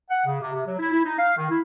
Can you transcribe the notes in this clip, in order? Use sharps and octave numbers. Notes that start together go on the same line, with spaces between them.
F#5
C#3
C3
C3
F#3
E4
E4
D#4
F5
D#3
E4